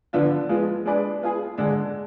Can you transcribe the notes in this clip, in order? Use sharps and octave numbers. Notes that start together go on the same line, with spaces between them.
D3 F3 B3 D4 F4
F3 G#3 B3 F4
G#3 D4 G#4 B4 D5
B3 F4 G#4
D3 G#3 D4